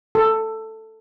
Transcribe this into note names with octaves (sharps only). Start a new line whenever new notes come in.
A4